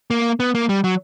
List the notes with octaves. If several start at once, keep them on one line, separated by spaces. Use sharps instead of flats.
A#3
B3
A#3
G3
F#3